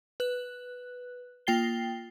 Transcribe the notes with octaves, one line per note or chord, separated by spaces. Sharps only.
B4 F#6
A#3 F4 G5 A6 C7 G7